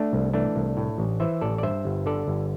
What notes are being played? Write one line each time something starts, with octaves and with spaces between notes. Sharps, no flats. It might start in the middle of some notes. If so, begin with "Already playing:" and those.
Already playing: A3 D4
C2
E3 A3 D4
C2
A2
A1
E3 C5 E5
A1 A4 D5
D5
G2 C5 E5
G1
D3 A4 D5
G1